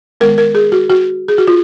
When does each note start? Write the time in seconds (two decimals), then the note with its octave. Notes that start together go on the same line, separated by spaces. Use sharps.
0.21 D#3 G#3 B3 A#4
0.38 A#4
0.55 G#4
0.72 F#4
0.90 F#4
1.28 G#4
1.38 F#4
1.47 F4